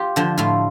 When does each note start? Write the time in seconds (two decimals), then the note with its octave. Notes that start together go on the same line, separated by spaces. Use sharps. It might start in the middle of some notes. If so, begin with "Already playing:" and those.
Already playing: F4 G4
0.16 D3 F3
0.38 A2 F4